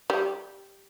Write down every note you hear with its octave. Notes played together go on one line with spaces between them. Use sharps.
G3